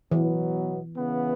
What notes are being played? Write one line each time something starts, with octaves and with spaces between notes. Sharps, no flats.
B2 E3 F#3 B3
C#3 E3 B3